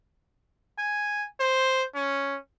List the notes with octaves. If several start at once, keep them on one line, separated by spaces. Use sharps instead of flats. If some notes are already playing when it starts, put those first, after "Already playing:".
G#5
C5
C#4